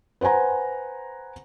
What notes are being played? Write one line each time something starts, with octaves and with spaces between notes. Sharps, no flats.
B4 C5 F#5 G#5 A#5